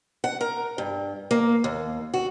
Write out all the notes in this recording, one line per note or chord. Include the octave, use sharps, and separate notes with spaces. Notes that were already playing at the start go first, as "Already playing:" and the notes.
F#5
A#4
G2
A#3
D#2
F#4